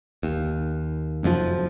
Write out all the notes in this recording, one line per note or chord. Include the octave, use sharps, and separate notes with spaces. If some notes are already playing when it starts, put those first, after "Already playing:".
D#2
F1 F#2 C3 F3